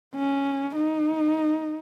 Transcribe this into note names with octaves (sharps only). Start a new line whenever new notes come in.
C#4
D#4